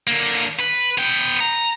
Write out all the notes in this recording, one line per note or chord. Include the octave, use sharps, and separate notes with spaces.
D3 A#3
B4
B3 G5
A#5